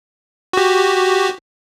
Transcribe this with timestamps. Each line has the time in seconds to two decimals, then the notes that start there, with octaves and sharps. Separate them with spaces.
0.53 F#4 G4